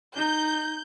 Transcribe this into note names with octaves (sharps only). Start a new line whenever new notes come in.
D#4 G6